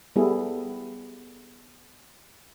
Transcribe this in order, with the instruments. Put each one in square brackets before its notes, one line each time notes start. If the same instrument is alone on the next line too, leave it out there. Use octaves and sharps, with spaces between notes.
[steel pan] G3 B3 E4 G#4 A4